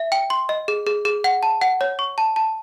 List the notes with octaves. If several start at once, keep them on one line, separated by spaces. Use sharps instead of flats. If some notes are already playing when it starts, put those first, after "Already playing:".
Already playing: E5
G5
C6
D#5
G#4
G#4
G#4
F#5
A5
F#5
C#5
C#6
A5
A5